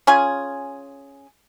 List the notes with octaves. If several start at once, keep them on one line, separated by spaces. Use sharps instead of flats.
C#4 F4 G#4 G#5